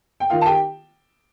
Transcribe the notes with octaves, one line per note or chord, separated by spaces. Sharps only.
G5
D#3 F4 F5
A5
G4 G5